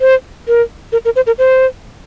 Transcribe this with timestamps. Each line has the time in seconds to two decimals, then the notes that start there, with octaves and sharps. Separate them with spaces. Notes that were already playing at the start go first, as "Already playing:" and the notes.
0.01 C5
0.48 A#4
0.92 A#4
1.05 A#4
1.16 C5
1.27 A#4
1.38 C5